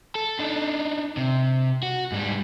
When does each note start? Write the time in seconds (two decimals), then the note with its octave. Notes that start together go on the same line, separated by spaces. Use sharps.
0.15 A4
0.39 D4 D#4
1.17 C3
1.83 F#4
2.12 G#2 G3